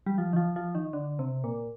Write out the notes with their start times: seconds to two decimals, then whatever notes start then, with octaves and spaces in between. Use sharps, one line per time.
0.06 G3
0.18 F3
0.33 D#3
0.36 F3
0.56 F3
0.75 D#3
0.93 D3
1.19 C3
1.44 A#2